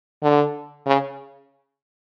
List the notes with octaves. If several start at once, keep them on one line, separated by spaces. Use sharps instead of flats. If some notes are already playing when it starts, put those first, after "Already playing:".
D3
C#3